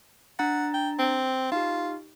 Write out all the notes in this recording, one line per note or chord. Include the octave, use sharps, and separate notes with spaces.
D4 F#5 A#5 A6
G5
C4
D#4 F4 G4